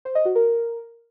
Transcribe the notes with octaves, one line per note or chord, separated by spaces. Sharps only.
C5
D#5
F#4
A#4